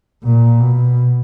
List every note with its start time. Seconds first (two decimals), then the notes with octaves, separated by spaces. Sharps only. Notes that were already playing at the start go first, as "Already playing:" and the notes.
0.24 A#2
0.60 B2